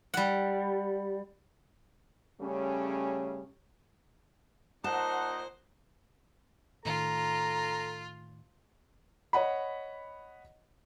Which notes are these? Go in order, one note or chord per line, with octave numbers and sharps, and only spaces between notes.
G3 F#5
C#3 G3 A3 C#4
A#2 D#4 C5 F#5 A5
A2 D#3 F4 A4 A#5
C#5 D#5 F#5 B5